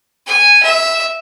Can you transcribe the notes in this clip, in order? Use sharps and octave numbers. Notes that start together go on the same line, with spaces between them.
G#5
E5